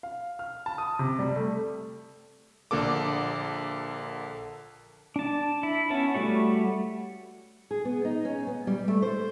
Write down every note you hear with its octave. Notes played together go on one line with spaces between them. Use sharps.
F5
F6
A5
D#6
C3
G3
A3
A#1 D3 A#3 A4 D6
D4 A5
E4
B3 C#4 E4 A5
G3 A3 F#4 C#5
G#4
B3
D#4
C#4
B3
G3
A3
C5